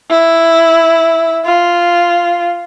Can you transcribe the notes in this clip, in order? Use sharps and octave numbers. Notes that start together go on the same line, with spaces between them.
E4
F4